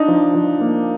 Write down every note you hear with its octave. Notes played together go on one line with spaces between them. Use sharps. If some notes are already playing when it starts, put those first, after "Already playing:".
Already playing: D4 D#4
F3
F3
A#3